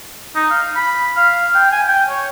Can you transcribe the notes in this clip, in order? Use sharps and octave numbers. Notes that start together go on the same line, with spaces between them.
D#4
F5
B5
F5
G5
G#5
G5
C#5